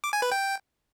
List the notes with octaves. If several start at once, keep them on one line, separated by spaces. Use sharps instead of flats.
D6
G#5
B4
G5